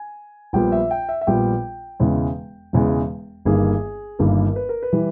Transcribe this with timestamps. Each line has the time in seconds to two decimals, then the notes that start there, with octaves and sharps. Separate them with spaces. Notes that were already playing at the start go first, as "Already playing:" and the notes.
Already playing: G#5
0.53 A#1 A#2 G3 B3 G5
0.72 E5
0.91 G5
1.09 E5
1.21 E5
1.27 A#1 A#2 G3 B3 G5
2.00 E1 E2 C#3 G#3
2.73 E1 E2 C#3 G#3
3.45 G1 G2 D#3 A#3 G#4
4.19 G1 G2 D#3 A#3 A#4
4.56 B4
4.69 A#4
4.83 B4
4.93 E3 G3